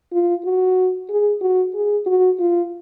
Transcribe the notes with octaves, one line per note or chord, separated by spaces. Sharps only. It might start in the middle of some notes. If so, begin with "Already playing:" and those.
F4
F#4
G#4
F#4
G#4
F#4
F4